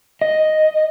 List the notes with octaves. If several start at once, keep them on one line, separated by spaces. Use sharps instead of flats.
D#5